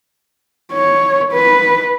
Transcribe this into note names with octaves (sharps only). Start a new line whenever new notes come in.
C#5
B4